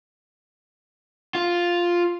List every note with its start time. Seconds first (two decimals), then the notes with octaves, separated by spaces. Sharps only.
1.35 F4